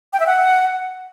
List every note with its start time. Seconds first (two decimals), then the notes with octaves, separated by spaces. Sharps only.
0.13 G5
0.20 E5
0.27 F#5